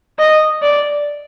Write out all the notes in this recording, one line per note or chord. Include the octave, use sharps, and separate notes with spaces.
D#5
D5